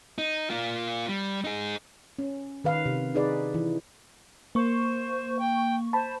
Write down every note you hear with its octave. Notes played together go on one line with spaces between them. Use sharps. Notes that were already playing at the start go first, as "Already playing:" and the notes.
D#4
A#3 F4
G3
D#4 G#4
C#4
D#3 B4 F5
C3
D#4 G#4 B4 D5
E3
A#3 C5 C#6
G5
C5 A5 B5